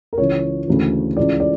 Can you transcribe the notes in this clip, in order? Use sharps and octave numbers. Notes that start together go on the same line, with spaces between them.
A#4
C#2 C#3 E3 C#5
D2 C#3 E3
C#2 C#3 E3 D5
D5